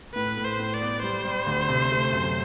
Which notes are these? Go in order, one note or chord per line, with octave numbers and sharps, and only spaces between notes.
A2 B4
A2
C5
A2
D5
B3
G3 C5
G3
D2
C3
A3
F#2